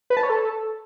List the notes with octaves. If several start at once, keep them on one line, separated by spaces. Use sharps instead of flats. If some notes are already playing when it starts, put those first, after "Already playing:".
B4
A5
C#5
A4